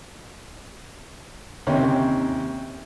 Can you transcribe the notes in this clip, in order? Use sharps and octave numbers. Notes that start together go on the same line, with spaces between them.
D#2 C3 C#4